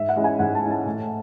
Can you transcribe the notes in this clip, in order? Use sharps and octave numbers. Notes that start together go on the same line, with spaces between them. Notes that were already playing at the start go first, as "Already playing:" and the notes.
Already playing: G#2 E5
F#5
G#3 C#4 E4
G#5
G#2 F#5
A5
G#3 C#4 E4
A5
A2